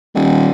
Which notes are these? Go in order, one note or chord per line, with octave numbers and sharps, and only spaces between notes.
D#1